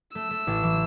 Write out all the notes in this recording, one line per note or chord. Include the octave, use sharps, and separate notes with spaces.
A3 E6
A3
A1
E3